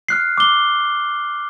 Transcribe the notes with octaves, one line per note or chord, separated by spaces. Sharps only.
F6 F#6 C7
D6 G7